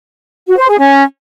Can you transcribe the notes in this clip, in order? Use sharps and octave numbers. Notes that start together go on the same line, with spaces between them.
F#4
C5
G#4
C#4